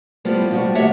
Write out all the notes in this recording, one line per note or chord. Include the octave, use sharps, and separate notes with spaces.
A2 F3 G3 B3
F2 G3 F#4
D#2 A2 G4 C#5 E5 F#5